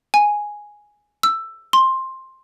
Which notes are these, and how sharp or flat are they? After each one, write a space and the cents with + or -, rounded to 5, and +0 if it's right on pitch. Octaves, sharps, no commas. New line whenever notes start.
G#5 +0
E6 +10
C6 +10